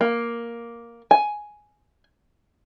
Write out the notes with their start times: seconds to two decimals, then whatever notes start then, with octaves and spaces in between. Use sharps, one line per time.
0.01 A#3
1.11 G#5